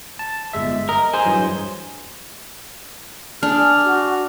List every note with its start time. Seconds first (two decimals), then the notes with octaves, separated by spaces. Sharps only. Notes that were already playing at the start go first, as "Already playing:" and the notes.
0.19 A5
0.53 G1 G#3 E5
0.89 A#4 D#5
1.13 G#4 C5
1.25 G2 E3 F#3
3.43 D4 G#4 F6
3.85 F#4